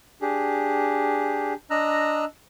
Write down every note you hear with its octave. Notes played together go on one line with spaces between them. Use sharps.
D4 G4 G#4
D4 D#5 A#5 E6 F#6